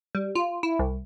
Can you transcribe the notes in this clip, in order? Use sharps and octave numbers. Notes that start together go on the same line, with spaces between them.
G3
F4
E4
C2